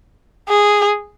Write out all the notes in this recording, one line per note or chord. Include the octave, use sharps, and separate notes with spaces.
G#4